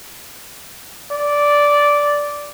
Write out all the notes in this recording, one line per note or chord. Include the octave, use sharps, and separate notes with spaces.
D5